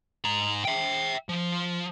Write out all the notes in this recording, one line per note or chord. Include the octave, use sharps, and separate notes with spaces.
G#2 A#5
E5 G5
F3